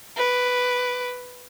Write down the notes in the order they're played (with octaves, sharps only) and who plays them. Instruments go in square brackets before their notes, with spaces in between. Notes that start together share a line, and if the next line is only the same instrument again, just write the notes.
[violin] B4 D6